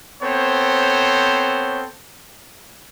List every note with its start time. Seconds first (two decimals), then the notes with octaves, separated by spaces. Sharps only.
0.23 B3 C4 A4 C5 C#5